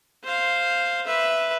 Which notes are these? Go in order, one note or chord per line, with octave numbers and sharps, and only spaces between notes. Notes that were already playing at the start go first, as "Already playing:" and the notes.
C5 F5
B4 E5